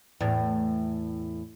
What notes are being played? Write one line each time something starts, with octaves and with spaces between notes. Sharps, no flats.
E2 A2